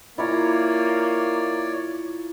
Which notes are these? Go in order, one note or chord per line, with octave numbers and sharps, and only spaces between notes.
A#3 E4 F4 C#5 D5 A#5